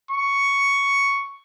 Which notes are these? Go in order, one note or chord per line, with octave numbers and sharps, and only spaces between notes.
C#6